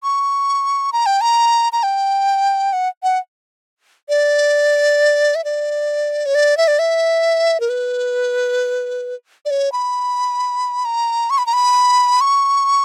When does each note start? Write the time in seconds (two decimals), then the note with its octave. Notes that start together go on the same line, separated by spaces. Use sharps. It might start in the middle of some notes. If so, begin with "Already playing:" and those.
0.03 C#6
0.93 A#5
1.06 G5
1.21 A#5
1.73 A#5
1.83 G5
2.73 F#5
3.03 F#5
4.09 D5
5.35 E5
5.44 D5
6.26 C#5
6.35 D5
6.57 E5
6.68 D5
6.79 E5
7.60 A#4
7.69 B4
9.45 D5
9.51 C#5
9.72 B5
10.85 A#5
11.30 C#6
11.38 B5
11.46 A#5
11.53 B5
12.21 C#6